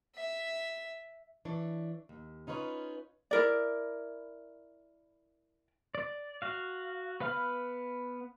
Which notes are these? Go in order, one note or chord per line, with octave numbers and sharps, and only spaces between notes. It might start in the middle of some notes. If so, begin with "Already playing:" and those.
E5
E3 D4 C#5
D#2
C#4 D#4 F4 B4 C#5
E4 A#4 D5
D5
F#4 F5
B3 B4 F5 B5 F6